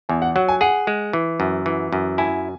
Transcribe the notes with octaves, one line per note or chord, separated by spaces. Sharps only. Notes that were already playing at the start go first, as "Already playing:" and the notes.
E2 G#5
F#5
F#3 F#5
G#5
G#4 F#5
G#3
E3
F#2
E3
F#2
E4 G#5